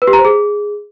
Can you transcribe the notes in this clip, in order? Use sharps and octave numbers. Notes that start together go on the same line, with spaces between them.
B4
G4
A#5
C5
G#4